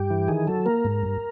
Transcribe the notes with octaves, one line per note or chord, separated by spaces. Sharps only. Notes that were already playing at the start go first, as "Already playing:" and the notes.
Already playing: G2 G4
E3
D#3 G#4
F#3 A4
A#3 A#4
G#2
G2